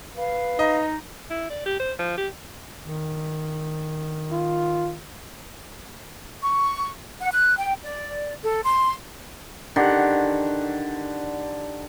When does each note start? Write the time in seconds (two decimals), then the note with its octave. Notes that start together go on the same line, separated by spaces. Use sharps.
0.16 B4 F5
0.59 D#4 D#5
1.30 E4
1.50 D5
1.66 G4
1.79 C5
1.99 F3
2.18 G4
2.82 D#3
4.31 F4
6.43 C#6
7.19 F#5
7.33 F#6
7.57 G5
7.83 D5
8.44 A4
8.64 C6
9.76 D3 D#3 G4 F#5